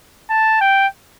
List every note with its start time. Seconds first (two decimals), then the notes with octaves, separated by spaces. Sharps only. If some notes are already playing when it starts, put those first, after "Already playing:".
0.30 A5
0.61 G5